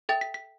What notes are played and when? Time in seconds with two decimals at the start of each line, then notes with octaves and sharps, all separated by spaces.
0.09 A4 E5 G5 A6
0.21 B6
0.34 B6